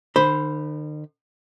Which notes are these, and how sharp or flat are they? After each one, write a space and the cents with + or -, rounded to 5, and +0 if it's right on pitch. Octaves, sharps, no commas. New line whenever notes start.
D#3 -45 C5 +0 B5 +5